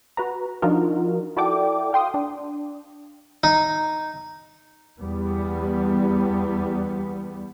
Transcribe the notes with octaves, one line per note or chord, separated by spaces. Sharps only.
F#4 B4 A#5
F3 D4 D#4 F4 F#4 A#4
E4 F#4 A4 D5 G5 D6
F5 G5 C6 D#6
D4
D#4
E2 G3 B3